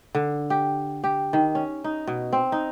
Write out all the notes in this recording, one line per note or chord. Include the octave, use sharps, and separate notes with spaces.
D3
G4
G4
D#3
C#4
D#4
B2
C4
D#4